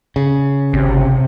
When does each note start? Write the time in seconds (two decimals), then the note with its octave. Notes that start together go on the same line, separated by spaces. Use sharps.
0.16 C#3
0.73 G#1 C3